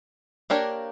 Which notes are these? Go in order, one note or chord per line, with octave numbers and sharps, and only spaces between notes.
A#3 D4 G4 A#4 C#5